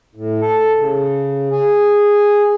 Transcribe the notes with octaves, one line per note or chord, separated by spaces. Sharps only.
A2
A4
C#3
G#4